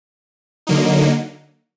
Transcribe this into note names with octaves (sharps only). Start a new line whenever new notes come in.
D3 F#3 A#3 D#4